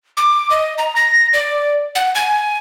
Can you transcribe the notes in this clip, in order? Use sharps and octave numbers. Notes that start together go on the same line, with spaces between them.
D6
D#5
A#5
A#6
D5
F#5
G#5